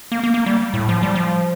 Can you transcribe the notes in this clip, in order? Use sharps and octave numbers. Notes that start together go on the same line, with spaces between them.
A#3
A#3
A#3
G3
A2
F3
G3
F3